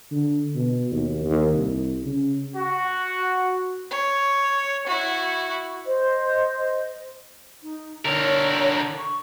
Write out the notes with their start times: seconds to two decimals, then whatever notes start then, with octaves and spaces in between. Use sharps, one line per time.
0.12 D3
0.55 B2
0.91 D#2
1.24 D#2
1.53 C2
2.04 C#3
2.56 F#4
3.91 C#5
4.87 E4 F#4
5.85 C5 D#5
7.63 D#4
8.05 D3 A#4 C#5
8.98 C#6